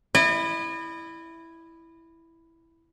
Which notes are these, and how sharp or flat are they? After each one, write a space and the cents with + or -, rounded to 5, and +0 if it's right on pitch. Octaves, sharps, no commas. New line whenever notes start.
E4 +0 D#5 -40